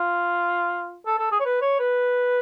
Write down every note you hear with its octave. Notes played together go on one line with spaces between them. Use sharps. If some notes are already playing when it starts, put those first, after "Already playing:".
Already playing: F4
A4
A4
G#4
C#5
B4
C#5
B4